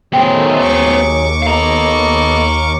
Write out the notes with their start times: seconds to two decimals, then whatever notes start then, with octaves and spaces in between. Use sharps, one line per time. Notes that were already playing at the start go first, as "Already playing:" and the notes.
0.13 D#3 F#3 A3 B3 G#4 C5 G5
0.56 D#2 C#6 D6
1.42 B3 A4 D#5 F5 A#5